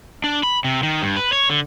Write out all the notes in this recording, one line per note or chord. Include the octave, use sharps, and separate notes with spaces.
D4
B5
C3
D#3
G2
B4
C#5
D3